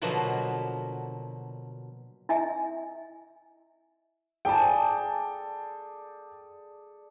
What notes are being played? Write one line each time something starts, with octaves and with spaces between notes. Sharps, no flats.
B2 D3 F3 F#3 A#3 B3
E4 D#5 E5 G#5
G#4 A4 D5 G5 A5